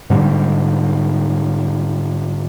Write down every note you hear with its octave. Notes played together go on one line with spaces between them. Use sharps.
G#2 D3 G3